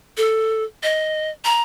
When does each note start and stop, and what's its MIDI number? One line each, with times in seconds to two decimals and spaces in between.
0.17 0.64 69
0.83 1.30 75
1.45 1.63 82